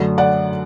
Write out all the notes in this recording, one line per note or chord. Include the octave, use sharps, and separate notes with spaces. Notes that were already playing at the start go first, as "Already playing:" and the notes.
Already playing: F#2 D3 F#3 A3
D5 F#5